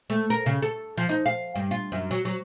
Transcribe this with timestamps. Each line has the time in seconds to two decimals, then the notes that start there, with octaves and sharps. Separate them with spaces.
0.10 A3
0.30 A#4
0.46 C#3
0.62 A4
0.98 F3
1.09 D#4
1.26 F5
1.55 G2
1.71 F4
1.92 F#2
2.11 F#3
2.25 F#3